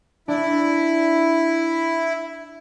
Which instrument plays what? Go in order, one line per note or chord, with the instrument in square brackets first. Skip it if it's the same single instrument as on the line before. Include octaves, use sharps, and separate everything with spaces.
[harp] D4 [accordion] E4